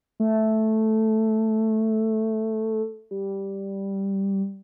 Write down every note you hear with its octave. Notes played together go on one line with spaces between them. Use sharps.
A3
G3